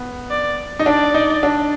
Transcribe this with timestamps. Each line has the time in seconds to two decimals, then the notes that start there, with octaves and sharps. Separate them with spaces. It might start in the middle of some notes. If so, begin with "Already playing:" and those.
Already playing: B3
0.31 D5
0.79 D#4
0.86 D4 D5
1.14 D#4
1.43 D4